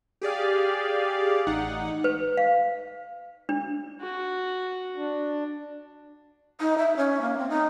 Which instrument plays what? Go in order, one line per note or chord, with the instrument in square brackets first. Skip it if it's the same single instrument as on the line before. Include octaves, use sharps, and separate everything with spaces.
[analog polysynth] G4 G#4 D5 F5
A1 D#4 F#5
[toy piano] B4
F5
D4
[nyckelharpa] F#4
[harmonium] D4
[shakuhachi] D#4
E5
C#4
A#3
C4
D#4